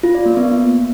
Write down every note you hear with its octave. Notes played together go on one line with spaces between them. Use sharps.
F4
D5
A#3
B3